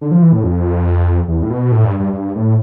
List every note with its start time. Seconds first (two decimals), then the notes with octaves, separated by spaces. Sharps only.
0.01 D3
0.11 F3
0.22 E3
0.33 A2
0.44 F2
1.28 E2
1.43 A2
1.50 B2
1.72 A2
1.85 G2
2.00 G2
2.13 G2
2.36 A2